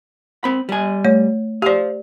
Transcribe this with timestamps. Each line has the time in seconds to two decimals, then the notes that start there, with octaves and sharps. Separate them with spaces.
0.44 C4 B5
0.69 G3 G#5
1.04 A3 C#5
1.62 G4 C5 D5 F5